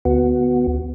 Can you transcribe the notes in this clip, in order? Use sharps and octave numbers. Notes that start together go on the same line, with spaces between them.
D2 B3 F#4